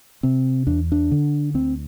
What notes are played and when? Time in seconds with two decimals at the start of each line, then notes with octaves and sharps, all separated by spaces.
0.23 C3 C4
0.67 E2 D4
0.92 D4
1.11 D3
1.54 D2 C4